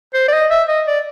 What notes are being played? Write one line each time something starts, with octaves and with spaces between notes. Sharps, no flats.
C5
D5
D#5
E5
D#5
D5